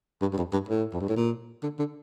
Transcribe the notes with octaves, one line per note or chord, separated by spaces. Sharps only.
G2
G2
F2
G2
A2
F2
G2
A2
A#2
D3
D3